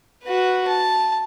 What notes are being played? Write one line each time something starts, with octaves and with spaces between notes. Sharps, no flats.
F#4 B4
A5